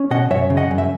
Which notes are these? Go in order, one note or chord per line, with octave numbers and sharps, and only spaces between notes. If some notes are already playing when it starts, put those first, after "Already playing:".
Already playing: C#4
B2 D#5 F#5
F#2 C#5 E5
C#3
D#5 F#5
F#2
E5